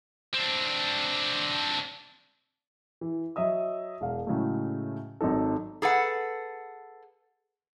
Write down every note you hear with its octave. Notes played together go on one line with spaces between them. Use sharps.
C4 D4
E3
F#3 D#5 E5 D#6
E1 F5
A2 C#3 F#3 G#3 A3
G#1 F#3 D#4 A4
G#4 A4 B4 F#5